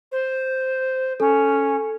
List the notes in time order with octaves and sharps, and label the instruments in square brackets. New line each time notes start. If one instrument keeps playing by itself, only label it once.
[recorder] C5
[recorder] C#4 [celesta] A4